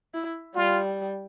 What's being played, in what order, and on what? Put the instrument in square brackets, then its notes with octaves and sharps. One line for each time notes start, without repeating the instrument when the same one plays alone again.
[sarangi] E4
[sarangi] G3 [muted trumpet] F4